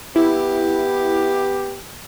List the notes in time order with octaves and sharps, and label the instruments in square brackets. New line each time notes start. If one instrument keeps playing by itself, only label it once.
[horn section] B3 G4 [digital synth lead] E4